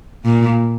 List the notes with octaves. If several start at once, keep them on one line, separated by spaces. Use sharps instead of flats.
A#2